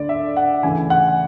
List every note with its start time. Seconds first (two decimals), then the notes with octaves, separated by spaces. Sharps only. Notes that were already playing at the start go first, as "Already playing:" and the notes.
Already playing: D2 D3 D5
0.09 E5
0.36 F#5
0.63 D2 C#3 E3 G#5
0.90 F#5